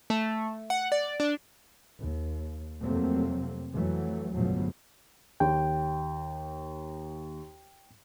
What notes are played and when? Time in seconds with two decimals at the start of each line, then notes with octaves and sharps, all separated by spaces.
0.10 A3
0.70 F#5
0.92 D5
1.20 D4
1.99 D#2
2.82 F2 C3 F#3 A3 A#3 C4
3.73 F2 E3 F#3 A3
4.35 G1 E2 B2 F3 F#3 A3
5.40 D#2 G5